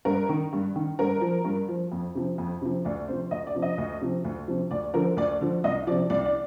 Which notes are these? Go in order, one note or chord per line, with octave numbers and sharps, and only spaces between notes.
G2 A#4
D#3
G2
D#3
G2 A#4
F3
G2
F3
F2
C3 F3
F2
C3 F3
D2 D5
C3 F3 C5
D2 D#5
D5
C3 F3
D#5
D2
C3 F3
D2
C3 F3
D2 D5
D3 F3 A#4
D2 D5
D3 F3
C2 D#5
C3 F3 D5
C2 D5
D5